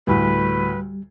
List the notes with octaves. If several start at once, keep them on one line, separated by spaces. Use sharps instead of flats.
D2 A2 G3 B4